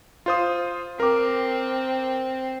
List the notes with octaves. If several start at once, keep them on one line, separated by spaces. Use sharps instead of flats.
F4 C5 D#6
C4 A#4 D6